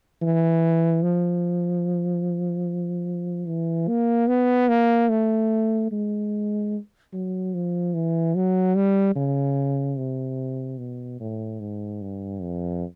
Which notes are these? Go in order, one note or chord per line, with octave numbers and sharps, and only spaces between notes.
E3
F3
E3
A#3
B3
A#3
A3
G#3
F#3
F3
E3
F#3
G3
C#3
C3
B2
A2
G#2
G2
F2